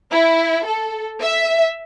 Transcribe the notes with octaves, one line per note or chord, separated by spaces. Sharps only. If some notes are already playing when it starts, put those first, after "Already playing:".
E4
A4
E5